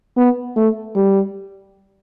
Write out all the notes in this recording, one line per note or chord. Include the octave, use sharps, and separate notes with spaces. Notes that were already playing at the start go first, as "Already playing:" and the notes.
B3
A3
G3